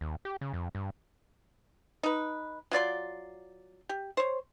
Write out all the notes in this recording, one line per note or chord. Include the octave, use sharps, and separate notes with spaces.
D#2
G4
C#3
F2
G2
D#4 B4
F#3 F4 D5 C6
G4
C5 C#5